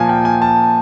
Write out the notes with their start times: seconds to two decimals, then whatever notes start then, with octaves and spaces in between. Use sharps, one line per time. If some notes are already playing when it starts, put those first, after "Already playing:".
Already playing: A#2 F3 G#5 A5
0.09 G5
0.25 G#5
0.42 A5